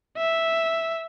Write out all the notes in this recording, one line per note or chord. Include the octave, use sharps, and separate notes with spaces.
E5